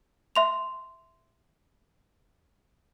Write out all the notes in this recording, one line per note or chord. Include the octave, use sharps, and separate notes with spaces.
E5 C6 F7